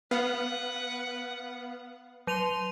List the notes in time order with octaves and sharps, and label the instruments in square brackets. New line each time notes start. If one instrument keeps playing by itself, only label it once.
[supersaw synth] B3 F5 [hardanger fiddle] B4 F#5
[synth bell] F#3 D#7 F7 [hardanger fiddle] C6